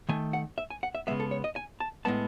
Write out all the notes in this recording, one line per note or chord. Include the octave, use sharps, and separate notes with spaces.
D#3 A3 G#5
F#5
E5
G#5
F#5
E5
C#3 G#3 B3 E5
A4
C#5
D#5
G#5
A5
A2 G#3 B3 A5